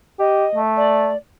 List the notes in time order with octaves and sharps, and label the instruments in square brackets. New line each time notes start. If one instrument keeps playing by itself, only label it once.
[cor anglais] G4 [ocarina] D#5
[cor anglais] A3
[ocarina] D5